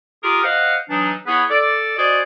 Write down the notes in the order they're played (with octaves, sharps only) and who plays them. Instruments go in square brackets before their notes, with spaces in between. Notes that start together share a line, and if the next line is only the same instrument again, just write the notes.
[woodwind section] F4 G4 G#4 A#4
C5 D#5 F5 F#5
E3 F#3 D4 D#4
B3 E4 G#4 B4 C#5
A4 D5
F#4 C5 D5 D#5 G#5